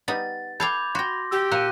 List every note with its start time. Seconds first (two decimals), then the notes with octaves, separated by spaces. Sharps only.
0.08 G3 B3 D#4 F#5 A6
0.60 A4 F5 G5 B5 D6 G6 G#6 F7
0.95 F#4 G5 C6 A#6
1.31 G4 E6
1.51 A#2 A#3 A#4 E6 F#6 C#7 D#7 E7